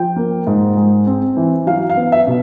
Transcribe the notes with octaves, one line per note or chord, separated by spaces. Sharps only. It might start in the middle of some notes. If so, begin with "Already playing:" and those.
Already playing: F3 G5
A#3
G#2
G#3
C4
E3
F#3 F5
F5
B3
E5
B2